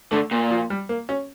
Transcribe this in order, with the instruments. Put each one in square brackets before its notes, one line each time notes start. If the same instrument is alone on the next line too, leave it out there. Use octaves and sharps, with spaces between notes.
[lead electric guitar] D3 [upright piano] A3
[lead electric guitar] A#2
[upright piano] F3
G3
A#3
C#4